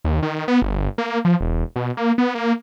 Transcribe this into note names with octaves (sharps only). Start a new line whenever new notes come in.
D#2
D#3
B3
G1
A#3
F3
E1
B2
A#3
B3
A#3